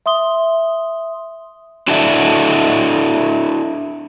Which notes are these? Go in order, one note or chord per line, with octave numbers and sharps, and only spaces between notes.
E5 C6 D#6 G7
D4 E4 F#4 A4 D5 E5